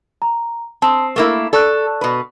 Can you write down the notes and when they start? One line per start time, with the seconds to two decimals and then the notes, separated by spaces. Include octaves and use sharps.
0.22 A#5
0.82 C4 A5 C6 D#6
1.16 A3 A#3 E4 A#4
1.53 A4 D5 C#6 F#6
2.01 B2 B4